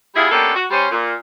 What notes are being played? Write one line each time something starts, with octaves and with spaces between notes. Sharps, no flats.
G3 B3 E4 F4 G#4
A#3 B3 C#4 D4 G4 A4
F#4
G3 C#4 C5
A#2